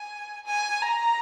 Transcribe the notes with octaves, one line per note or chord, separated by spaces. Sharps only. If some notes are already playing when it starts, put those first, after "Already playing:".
Already playing: G#5
G#5
A#5